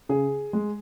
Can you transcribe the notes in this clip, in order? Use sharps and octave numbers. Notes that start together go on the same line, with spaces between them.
C#3 G#4
G#3